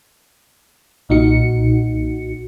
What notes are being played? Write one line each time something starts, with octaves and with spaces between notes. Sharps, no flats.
B1 A#2 D#4 F#4 C#7